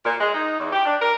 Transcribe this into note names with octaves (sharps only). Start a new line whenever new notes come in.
A#2
G#3
D#4
E2
G4
D4
A#4